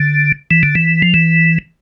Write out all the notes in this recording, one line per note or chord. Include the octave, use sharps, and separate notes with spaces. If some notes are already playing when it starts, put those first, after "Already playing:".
Already playing: D3
E3
D3
E3
F3
E3